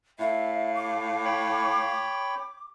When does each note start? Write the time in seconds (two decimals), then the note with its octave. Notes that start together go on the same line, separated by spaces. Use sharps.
0.19 A2 E5 F5
0.74 D6
1.25 C#5 G5 B5